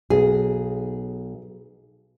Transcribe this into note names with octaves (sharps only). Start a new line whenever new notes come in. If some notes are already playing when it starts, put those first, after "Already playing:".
B1 G#4